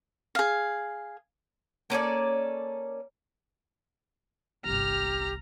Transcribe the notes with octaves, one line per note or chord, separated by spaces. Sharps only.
G#4 F5
A#3 C#4 A4 D5
G1 C2 G4 A#5 F6